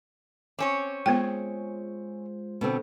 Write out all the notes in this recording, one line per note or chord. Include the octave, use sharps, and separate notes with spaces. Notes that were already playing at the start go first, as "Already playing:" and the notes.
C4 C#4 C#5 D6
G#3 B3 F4 G#4 C5 G5
B2 D3 C4